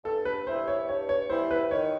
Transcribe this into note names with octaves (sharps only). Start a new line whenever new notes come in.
G2 A4
B4
E3 G3 B3 E4 C5
C#5
G2 C#5
C#5
E3 G3 B3 E4 C5
B4
D#3 C#5